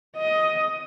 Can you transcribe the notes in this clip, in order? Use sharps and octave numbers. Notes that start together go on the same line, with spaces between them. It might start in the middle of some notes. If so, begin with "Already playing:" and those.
D#5